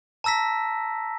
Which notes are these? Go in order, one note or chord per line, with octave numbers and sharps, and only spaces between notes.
A5 A#5 E6 A#6 B6